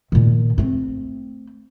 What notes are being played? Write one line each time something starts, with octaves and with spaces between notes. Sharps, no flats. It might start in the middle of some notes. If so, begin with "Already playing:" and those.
A#2 D#3
A3 C4